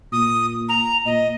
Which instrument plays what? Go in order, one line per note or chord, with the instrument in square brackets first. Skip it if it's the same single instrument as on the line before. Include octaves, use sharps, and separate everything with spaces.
[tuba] A#2 [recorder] D#6
[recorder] A#5
[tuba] A#2 [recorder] D#5